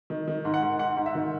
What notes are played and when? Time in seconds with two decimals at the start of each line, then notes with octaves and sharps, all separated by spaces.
0.10 D#3
0.28 D#3
0.45 G#2
0.54 F#5
0.63 G#2
0.79 G#2 F#5
0.97 G#2
1.06 E5
1.15 D#3